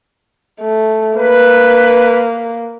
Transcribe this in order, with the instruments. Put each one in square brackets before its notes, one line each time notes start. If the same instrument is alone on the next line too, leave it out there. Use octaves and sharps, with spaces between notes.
[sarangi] A3
[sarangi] A#3 [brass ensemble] B4